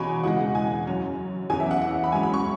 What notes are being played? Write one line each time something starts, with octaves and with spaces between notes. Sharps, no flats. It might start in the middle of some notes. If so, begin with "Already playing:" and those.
Already playing: E2 B2 F#3 C#4 G#5 B5 C#6
C#3 E3 G#3 F#5
G#5
F#2 F#3 C#4
E2 E3 C#4 G#5
E5
F#5
F#5
B5
G#2 F#3 C#4 G#5
B5
C#6